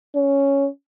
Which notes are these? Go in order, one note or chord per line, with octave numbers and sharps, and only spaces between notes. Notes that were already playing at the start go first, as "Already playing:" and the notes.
C#4